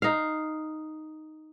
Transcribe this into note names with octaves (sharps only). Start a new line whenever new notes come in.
D#4 F5